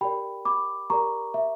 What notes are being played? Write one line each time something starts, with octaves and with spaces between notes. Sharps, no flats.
G4 A#4 D5 G5 B5
B5 D6
G4 A#4 D5 A#5 C#6
E5